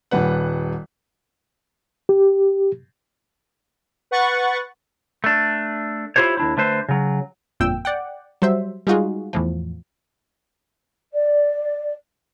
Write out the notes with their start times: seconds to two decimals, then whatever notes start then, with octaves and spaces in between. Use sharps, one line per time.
0.11 D#1 G3 B4 F#5
2.09 G4
4.11 B4 F#5 C#6 A6
5.24 A3 D4
6.16 E4 F4 G4 C5 C#5
6.37 D#2 D4 E4
6.57 D3 A3 B4 C5
6.89 C#3 F#3
7.60 G1 F2 A#2 G5 E6
7.85 D5 F#5 G5
8.42 F#3 G3 C5 E5
8.87 G3 G#3 D#4 F4 F#4 G#4
9.33 E2 A2 F3
11.13 D5